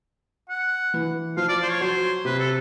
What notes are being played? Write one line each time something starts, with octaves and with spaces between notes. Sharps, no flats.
F#5
E3
F3 F5
D5
C5
C#5
F#3 C5
C3 B4
A4